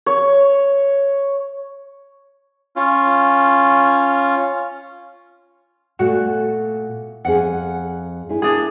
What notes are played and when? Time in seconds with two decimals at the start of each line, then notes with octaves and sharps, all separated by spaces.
0.06 C#5
2.76 C#4 F4
5.99 A#2 A3 F#4
7.25 F2 G#4 F#5
8.29 E4 G#4
8.42 A#3 D4 E4 G#4